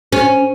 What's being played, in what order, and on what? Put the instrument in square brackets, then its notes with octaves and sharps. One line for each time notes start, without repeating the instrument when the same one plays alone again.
[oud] C#4